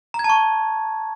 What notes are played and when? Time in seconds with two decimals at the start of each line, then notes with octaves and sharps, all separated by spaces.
0.14 A#5
0.19 G#6
0.24 A5
0.29 C#6